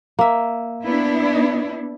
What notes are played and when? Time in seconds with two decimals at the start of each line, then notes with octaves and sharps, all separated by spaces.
0.19 A#3 E5
0.86 B3 D4 E4